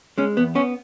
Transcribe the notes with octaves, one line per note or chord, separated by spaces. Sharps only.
G#3 C#4
E2 B3
B3 C#4